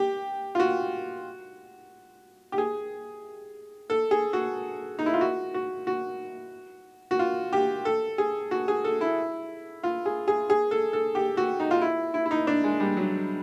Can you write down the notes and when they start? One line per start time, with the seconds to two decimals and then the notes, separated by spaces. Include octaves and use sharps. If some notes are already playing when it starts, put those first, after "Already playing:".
Already playing: G4
0.55 F4
0.60 F#4
2.52 G4
2.58 G#4
3.90 A4
4.11 G#4
4.33 F#4
4.99 D#4
5.06 E4
5.14 F4
5.21 F#4
5.54 F#4
5.87 F#4
7.11 F#4
7.19 F4
7.53 G4
7.85 A4
8.18 G#4
8.51 F#4
8.68 G#4
8.84 A4
9.01 E4
9.83 F4
10.06 G#4
10.28 G#4
10.50 G#4
10.71 A4
10.93 A4
11.15 G4
11.37 F#4
11.60 D#4
11.71 F4
11.81 E4
12.14 E4
12.26 E4
12.31 D#4
12.47 D4
12.64 G#3
12.80 G3
12.97 F#3